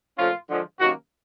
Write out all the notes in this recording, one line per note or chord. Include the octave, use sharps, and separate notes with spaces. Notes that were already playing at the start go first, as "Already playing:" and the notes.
A#2 F3 A3 C#4 F4
D3 F3 G#3
C3 D#3 F#3 A#3 C#4 F#4